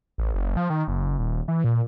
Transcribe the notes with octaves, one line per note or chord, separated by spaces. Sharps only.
A1
F#1
F3
D#3
F#1
D#1
E3
A#2